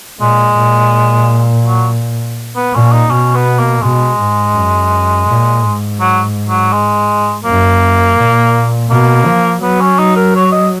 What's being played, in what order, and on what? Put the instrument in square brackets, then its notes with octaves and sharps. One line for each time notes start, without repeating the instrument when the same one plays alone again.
[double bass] A#2 [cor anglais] G#3
[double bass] A#2
[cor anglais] F#3
B3
[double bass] A#2 [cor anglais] C#4
[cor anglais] D#4
[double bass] B2 [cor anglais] C#4
[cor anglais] B3
A#3
[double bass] B2 [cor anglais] G#3
[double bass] G#2
F#2
A#2
G#2
[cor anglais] F#3
F#3
G#3
[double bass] F#2 [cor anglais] A#3
[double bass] A#2
[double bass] B2 [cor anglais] A#3
[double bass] F3
[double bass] F#3 [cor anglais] B3
[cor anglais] C#4
D#4
A#4
C#5
D#5